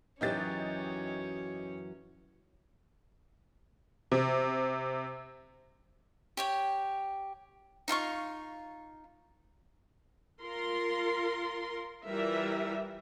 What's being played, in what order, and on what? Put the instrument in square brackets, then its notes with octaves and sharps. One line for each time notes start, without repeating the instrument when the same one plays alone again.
[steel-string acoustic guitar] F#2 E3 F#3 [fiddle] C#4 [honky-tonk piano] D#4 G4 A6
[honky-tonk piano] C3
[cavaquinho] G4 C#5 G5
D#4 F4 F5 C#6
[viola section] F4 A#4 C6
E3 G3 F4 A#4 E5